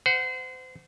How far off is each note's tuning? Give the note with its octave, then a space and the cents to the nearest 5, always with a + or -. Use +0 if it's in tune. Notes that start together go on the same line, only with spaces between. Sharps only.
C5 -30 F#5 -5